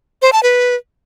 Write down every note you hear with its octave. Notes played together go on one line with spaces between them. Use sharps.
C5
A5
B4